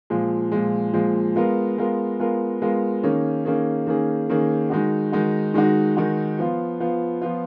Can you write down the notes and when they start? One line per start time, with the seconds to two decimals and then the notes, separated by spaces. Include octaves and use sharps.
0.10 A#2 F3 G#3
0.52 A#2 F3 G#3
0.94 A#2 F3 G#3
1.35 G#3 B3 F4 A#4
1.78 G#3 B3 F4 A#4
2.19 G#3 B3 F4 A#4
2.62 G#3 B3 F4 A#4
3.03 D#3 A#3 C#4 G#4
3.45 D#3 A#3 C#4 G#4
3.87 D#3 A#3 C#4 G#4
4.29 D#3 A#3 C#4 G#4
4.70 D#3 G#3 D#4 F#4
5.12 D#3 G#3 D#4 F#4
5.54 D#3 G#3 D#4 F#4
5.97 D#3 G#3 D#4 F#4
6.39 F3 B3 F4
6.80 F3 B3 F4
7.21 F3 B3 F4